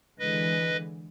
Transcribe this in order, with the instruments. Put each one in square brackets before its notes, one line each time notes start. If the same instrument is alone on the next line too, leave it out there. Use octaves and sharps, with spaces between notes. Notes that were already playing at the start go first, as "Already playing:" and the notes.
[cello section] D3 E3 G#3 [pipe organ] B4 D#5